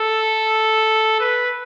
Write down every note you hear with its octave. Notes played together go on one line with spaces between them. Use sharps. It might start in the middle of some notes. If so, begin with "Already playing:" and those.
Already playing: A4
B4